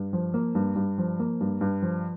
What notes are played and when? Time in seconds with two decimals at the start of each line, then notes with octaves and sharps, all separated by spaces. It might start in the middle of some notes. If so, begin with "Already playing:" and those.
Already playing: G2
0.13 F3
0.34 A#3
0.55 G2
0.76 G2
0.98 F3
1.19 A#3
1.41 G2
1.61 G2
1.82 F3